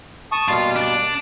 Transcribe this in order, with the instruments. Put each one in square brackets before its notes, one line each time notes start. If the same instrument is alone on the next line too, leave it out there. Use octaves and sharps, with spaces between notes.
[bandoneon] A5 C#6 D#6
[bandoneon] B2 G3 A#3 [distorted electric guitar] F4
[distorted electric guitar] D4